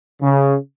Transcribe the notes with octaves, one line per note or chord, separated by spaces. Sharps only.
C#3